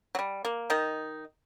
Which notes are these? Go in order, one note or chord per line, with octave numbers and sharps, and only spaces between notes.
F#3
G3
A#3
D#3 D#4